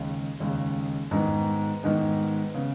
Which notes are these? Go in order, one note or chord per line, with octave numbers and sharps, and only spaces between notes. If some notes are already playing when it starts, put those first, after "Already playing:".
Already playing: D#2 C#3 G#3
D#2 C#3 G#3
G#2 D#3 G#3 B3
G#2 D#3 G#3 B3
C#3 B3